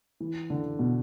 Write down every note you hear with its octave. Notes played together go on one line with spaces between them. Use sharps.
E3
D3
B2